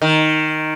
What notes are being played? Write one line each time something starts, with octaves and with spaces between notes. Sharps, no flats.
D#3